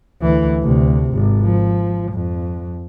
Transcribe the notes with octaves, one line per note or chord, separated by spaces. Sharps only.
D2 E3
D2 C3
G#1
F3
F2